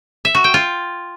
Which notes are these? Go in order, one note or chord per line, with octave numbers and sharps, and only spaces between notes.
E5
F#4
G5
F4